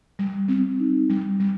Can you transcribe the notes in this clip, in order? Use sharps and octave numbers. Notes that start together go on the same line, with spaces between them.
G3
C4
D#4
G3
G3